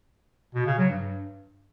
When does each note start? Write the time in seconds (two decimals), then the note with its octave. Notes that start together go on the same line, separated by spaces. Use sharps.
0.55 B2
0.67 C#3
0.78 F#3
0.90 G2